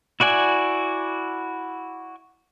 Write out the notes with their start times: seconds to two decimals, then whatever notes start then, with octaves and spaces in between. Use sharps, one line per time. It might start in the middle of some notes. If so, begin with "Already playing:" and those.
0.20 E4 F#4 D5 G#5